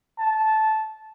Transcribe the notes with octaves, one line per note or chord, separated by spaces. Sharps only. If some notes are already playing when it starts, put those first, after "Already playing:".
A5